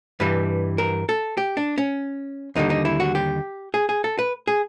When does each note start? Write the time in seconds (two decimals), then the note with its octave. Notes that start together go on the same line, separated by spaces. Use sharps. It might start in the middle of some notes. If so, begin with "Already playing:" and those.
0.20 G2 E3 G3 B4
0.78 A#4
1.09 A4
1.37 G4
1.57 D4
1.78 C#4
2.55 D#2 D3 G3 D#4
2.70 D#4
2.85 E4
3.00 F#4
3.15 G4
3.74 G#4
3.89 G#4
4.04 A4
4.19 B4
4.47 G#4